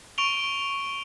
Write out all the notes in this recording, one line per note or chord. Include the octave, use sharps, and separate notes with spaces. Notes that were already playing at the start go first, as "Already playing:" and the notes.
C#6 D7 F7 G7